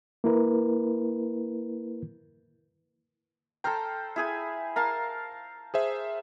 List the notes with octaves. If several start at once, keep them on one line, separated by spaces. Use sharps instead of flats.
A#3 E4 A#4 B4
A4 C5 G5 A#5 F6
E4 G#4 G#5
A#4 F5 A5
G#4 C5 E5